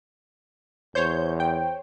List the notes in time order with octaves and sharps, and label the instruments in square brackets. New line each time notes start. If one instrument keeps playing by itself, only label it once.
[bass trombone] E2 [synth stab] C5 C#5 [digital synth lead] G6
[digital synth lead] G5